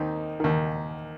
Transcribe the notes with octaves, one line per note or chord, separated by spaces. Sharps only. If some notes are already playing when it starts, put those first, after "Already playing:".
Already playing: D#2 D#3 C4 D#4
D#2 D#3